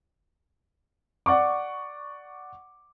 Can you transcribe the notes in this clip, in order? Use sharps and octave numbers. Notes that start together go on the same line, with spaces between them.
D5 F#5 C#6 D6